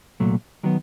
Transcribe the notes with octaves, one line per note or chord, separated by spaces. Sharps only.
C2 A#2 F#3 A3
D#3 F#3 B3